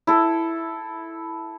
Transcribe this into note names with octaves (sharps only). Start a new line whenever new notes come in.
E4 A4